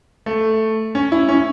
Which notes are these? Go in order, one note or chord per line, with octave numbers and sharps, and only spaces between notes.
A3
C#4
E4
C#4